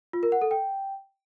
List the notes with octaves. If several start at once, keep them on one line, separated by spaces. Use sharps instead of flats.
F4
A#4
F#5
A4
G5